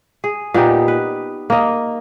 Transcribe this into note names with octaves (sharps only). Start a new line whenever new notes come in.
G#4
A#2 B3 D#4 G4
B4
A#3 D#5